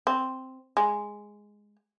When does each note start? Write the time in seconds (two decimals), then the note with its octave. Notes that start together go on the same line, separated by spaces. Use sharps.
0.07 C4
0.77 G#3